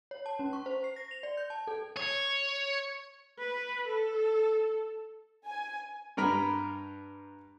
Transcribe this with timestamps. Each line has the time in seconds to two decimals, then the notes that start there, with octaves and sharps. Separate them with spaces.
0.11 C#5
0.26 A5
0.39 C#4
0.53 C#6
0.66 C5
0.84 C7
0.96 A#6
1.11 F7
1.23 D5
1.37 G6
1.50 A5
1.67 A4
1.97 C#5
3.38 B4
3.88 A4
5.47 G#5
6.17 G2 A#4 B5